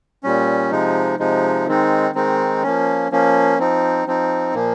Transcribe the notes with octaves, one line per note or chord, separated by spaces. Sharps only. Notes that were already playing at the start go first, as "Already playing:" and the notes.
A#2 G3 C#4
C3 F3 G#3 D#4
C3 F3 G#3 D#4
D#3 G#3 C4 D#4
D#3 G#3 C4 D#4
F3 A#3 C#4
F3 A#3 C#4
F3 C4 D#4
F3 C4 D#4
A#2 F3 A#3